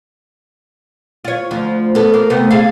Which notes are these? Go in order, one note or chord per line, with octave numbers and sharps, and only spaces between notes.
F4 C#5
D2 F3
B3 A4
A#3
C3 A3 B3
G#4 A4 F5